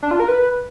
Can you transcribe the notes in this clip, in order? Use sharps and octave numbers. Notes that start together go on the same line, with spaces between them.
D4
F4
A#4
B4